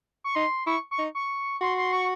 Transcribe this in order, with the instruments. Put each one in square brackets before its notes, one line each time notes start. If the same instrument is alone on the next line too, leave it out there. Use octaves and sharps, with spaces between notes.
[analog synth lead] C#6
[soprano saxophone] D#4 [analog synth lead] C6
[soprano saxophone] E4 [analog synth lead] C#6
[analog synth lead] C#6
[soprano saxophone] D#4
[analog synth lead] C#6
[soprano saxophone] F#4 [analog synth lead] C6
[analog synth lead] C6
C#6